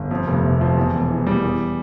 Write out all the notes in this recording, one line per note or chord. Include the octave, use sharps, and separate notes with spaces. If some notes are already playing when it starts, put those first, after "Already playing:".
Already playing: G1
F2
F1
C3
F3
E2
E1
E3
G3
E2